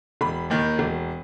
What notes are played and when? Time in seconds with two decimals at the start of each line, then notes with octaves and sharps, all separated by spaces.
0.21 E1 B5
0.50 D#2 D#3
0.79 E1